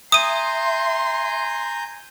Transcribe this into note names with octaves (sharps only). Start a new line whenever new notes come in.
E5 G#5 A#5 C6 D#6 G6 D#7